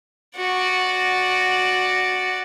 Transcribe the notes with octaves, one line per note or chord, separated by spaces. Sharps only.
F#4 D5